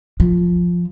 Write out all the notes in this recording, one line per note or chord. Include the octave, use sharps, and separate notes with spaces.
F3